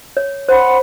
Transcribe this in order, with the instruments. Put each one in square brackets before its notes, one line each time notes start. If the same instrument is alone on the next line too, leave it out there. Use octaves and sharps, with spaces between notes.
[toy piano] C#5
[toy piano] C5 [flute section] F#5 B5 C6